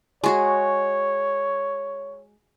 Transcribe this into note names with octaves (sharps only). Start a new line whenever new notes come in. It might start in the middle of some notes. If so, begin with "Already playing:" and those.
G#3 F#4 G#4 C#5